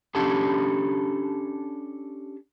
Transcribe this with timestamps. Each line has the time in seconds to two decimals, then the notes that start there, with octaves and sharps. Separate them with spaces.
0.15 C#4 D4 G4 A4 A5